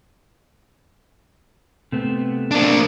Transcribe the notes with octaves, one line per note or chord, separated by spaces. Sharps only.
C3 A3 B3
A#3 D4